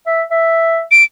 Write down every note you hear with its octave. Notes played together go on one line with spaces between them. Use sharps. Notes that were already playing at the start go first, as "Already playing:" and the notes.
E5
E5
D7